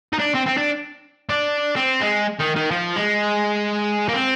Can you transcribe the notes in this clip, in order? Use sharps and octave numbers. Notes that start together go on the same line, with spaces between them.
D#4
D4
C4
C4
D4
D4
C4
G#3
D#3
D#3
F3
G#3
A#3
C4